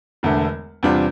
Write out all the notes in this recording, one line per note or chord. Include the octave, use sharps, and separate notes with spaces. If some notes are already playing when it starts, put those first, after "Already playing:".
E1 E2 D3 A3
E2 C3 G3 D4 F4